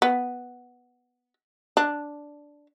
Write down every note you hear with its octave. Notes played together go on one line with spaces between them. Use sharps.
B3
D4